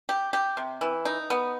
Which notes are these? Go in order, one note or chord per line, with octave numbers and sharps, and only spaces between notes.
G4
G4
C3
E3
D#4
B3